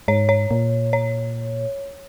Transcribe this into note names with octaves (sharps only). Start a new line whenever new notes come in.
G#2 C#5
C#5
A#2
C#5